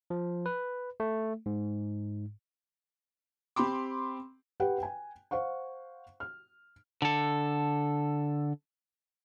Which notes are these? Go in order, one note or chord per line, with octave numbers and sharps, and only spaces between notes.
F3
B4
A3
G#2
C4 G4 B5 C6 D6
G4 B4 F#5 G5
G5 G#5
C5 F5 F#5 C#6
F6
D3 A4